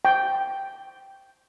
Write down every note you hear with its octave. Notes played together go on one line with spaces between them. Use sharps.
G5